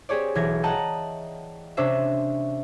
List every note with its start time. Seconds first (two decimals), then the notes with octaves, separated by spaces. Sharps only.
0.09 C4 G4 G#4 C#5 D5
0.35 B1 E3 G#6 A#6
0.63 D#5 F#5 G5 A5 A#5
1.77 C3 C#4 D4 C5 E5